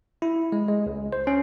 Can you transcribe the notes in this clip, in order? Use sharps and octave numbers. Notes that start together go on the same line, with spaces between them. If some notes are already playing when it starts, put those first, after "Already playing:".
E4
G#3
G#3
C#2
C5
C#4